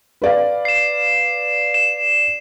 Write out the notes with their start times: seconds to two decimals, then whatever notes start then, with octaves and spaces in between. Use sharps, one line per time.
0.22 B4 D5 F5
0.65 C7 E7
1.74 E7